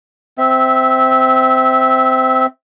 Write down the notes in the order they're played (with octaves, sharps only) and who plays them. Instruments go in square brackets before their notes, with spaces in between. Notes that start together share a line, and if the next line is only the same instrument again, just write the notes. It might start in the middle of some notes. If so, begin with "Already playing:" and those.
[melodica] C4 E5